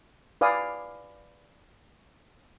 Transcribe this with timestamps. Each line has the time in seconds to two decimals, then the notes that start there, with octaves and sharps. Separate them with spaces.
0.41 B4 D5 F5 G#5 D#6